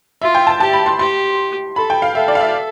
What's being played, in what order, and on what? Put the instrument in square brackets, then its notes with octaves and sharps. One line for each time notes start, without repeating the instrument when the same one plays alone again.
[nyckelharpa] F4 [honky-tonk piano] E5
[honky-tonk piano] G5
A5
[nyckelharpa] G4 [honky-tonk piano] A5
[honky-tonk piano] B5
C6
[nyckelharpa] G4 [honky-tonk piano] C6
[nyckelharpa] A4 [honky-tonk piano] B5
[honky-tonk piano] G5
F5
[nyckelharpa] A4 [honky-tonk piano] E5
[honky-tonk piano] D5
F5
E5